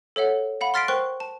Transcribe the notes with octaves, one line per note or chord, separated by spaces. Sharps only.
A4 C#5 E5 F#5
F5 F#5 B5
C6 F6 A6 B6 C7 D7
A#4 C5 G5 C#6 F#6
A5